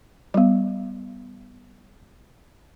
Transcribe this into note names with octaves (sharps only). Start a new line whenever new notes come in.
G3 B3